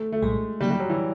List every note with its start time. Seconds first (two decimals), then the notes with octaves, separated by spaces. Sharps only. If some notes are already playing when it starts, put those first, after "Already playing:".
Already playing: A3
0.12 A3
0.22 C2 A#2 G3 G#3
0.61 C#3 F#3 G3 A#3 D#4
0.71 G3
0.80 F#3
0.90 E3